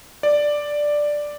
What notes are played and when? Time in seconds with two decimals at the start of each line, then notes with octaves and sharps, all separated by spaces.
0.23 D5